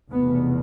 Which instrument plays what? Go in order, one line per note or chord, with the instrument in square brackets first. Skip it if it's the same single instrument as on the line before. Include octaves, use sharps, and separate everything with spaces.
[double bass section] F1 E2 B2 B3